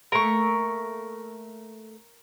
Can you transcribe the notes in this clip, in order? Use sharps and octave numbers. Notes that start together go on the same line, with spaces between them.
A3 A#3 A#4 C#6